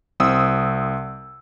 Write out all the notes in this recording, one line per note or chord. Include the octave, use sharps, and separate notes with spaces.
C2 C4 D#6 E6